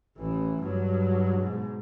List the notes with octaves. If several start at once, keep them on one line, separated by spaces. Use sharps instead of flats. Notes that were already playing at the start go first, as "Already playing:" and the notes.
A1 E3
G2 F#3
G#2 B2